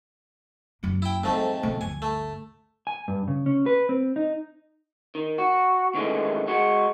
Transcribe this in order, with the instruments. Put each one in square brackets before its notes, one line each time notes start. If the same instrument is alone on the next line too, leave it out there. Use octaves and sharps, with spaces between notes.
[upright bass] F#2 A#3
[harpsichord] E4 G5
[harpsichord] F2 G#2 A3 [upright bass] G3
[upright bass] B2 F3
[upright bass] G1 D2 [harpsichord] G#5
[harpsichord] A3
[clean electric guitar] G#5
G2
C#3
C#4
B4
C4
D#4
D#3
F#4
D#3 E3 G#3 A3 C#4
G#3 F#4